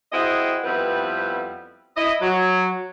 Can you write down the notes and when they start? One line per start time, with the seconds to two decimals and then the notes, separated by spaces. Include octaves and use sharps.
0.12 C4 E4 F#4 G#4 C5 D#5
0.64 F2 G3 B3 C4 E4 B4
1.97 E4 D#5
2.21 F#3